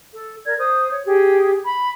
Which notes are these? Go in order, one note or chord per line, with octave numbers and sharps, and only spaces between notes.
A4
A#4 D5 G#6
C5 D#6
C#5
G4 G#4
B5